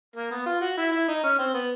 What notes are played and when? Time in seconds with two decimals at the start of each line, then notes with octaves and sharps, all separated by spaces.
0.16 A#3
0.31 B3
0.46 F4
0.61 F#4
0.77 E4
0.92 E4
1.08 D#4
1.24 C#4
1.39 C4
1.54 B3